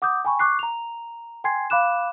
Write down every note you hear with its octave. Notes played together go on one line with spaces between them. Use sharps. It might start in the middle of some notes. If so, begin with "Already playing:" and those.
F#5 D6 D#6 G6
G5 G#5 B5 C#6
C#6 D6 F#6 C7
A#5 F7
G5 G#5 C6 G#6 C7
F5 B5 D6 F#6 E7